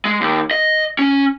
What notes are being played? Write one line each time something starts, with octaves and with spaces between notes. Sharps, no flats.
G#3
D#2
D#5
C#4